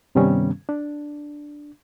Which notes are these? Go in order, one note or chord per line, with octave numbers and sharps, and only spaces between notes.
G2 C3 D#3 G3 B3 C#4
D4